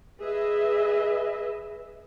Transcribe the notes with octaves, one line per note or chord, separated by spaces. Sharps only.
G#4 B4 D#5 E5